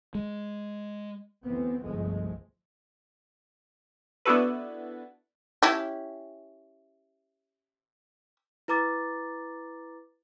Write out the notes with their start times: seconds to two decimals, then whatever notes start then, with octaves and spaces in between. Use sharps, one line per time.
0.15 G#3
1.44 D2 E3 B3 C4
1.84 G1 C2 F3 G#3 A3
4.25 B3 D4 E4 F#4 A4 B4
5.63 C#4 E4 G4
8.68 E4 B4 A#5 D6 A6